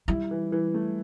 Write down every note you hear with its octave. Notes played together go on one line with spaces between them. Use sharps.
G3 E4
E3
E3
A3